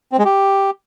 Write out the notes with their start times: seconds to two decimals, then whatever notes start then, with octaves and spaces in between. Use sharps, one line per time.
0.12 C4
0.19 G#3
0.25 G4